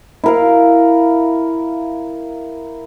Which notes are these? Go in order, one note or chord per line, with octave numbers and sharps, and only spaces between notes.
E4 A#4 F5